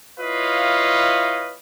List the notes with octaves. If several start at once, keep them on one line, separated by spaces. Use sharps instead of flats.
E4 F4 B4 C#5 D#5 F5